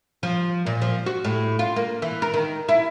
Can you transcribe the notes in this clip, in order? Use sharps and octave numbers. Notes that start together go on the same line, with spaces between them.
F3
A#2
F3
F#4
A2
F4
A#3
E3
A#4
D#3
E4